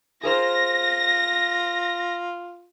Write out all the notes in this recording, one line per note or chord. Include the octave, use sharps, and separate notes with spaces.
F4 G#4 A#4 C5 A#6